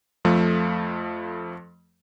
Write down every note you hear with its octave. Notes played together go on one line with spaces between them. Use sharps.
F2 F3 A3